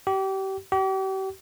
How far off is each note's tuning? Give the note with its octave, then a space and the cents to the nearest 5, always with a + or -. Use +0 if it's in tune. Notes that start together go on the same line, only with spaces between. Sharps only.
G4 -30
G4 -40